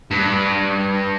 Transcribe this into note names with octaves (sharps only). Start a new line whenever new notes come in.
G2